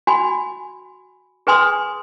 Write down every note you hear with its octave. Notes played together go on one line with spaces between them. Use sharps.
F#4 G#5 B5
G#4 B4 G#5 C6 D#6